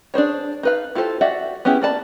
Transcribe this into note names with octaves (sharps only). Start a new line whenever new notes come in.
D4 G#4 C5 C#5
D#4 B4 F5
E4 F4 G4 A4 C5
F#4 G4 D5 E5 F#5
B3 C#4 E4 G4 G#4
A#3 D5 A5 B5